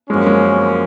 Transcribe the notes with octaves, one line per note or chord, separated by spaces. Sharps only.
F#2 F3 G#3 A#3 C#4
G#3